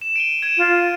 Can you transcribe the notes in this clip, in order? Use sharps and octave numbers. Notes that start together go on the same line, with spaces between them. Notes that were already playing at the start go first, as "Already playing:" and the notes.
E7
D7 D#7 G7
G#6 D#7 E7
F4